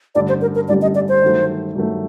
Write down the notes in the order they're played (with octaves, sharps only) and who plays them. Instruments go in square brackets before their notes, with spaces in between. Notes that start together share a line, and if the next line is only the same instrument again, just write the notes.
[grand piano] A1 G2 D3 G3 [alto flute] D5
[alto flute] C5
A#4
A#4
[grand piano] A1 G2 D3 G3 [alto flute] D5
[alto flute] D#5
D5
C5
[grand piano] G2 D#3 F#3 A3
G2 D#3 F#3 A3